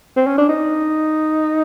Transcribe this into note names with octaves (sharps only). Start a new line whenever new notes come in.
C4
C#4
D4
D#4